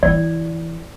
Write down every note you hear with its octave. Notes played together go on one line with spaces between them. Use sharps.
E3 E4 D5